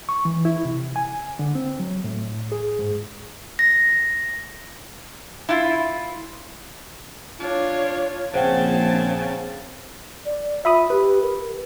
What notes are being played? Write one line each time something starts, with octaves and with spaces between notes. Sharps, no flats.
C#6
E3
E4
C3
G#5
D3
C4
F#3
A2
G#4
G#2
A#6
E4 F4
D4 F4 C#5
A#1 C#3 C4 C5 F#5 G5 A5
D5
F4 E5 B5 D#6
G4 B4
A#4